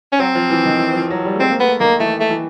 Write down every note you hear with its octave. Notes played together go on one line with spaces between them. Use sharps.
C#4
F#3 C4
F3
E3
D#3
E3
F3
F#3
G3
A3
G#3 C4
A#3
A3 B3
D#3 A#3
E3 A3
A3
E3